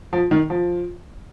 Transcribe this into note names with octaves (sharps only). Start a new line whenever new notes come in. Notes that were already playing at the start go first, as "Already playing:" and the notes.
F3
D#3
F3